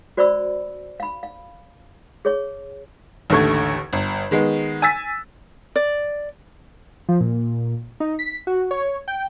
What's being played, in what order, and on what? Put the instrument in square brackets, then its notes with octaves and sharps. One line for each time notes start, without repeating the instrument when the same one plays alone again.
[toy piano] F#4 C5 D5 B5 C#6 E6
F5 B5
F5
G#4 C#5 C#6
[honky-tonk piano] A1 D#2 D3 A3 C#6 G#6
G1
D#3 G#3 B3
G#5 E6 A6 B6
[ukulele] D5
[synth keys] F3
A#2
D#4
B6
F#4
C#5
G5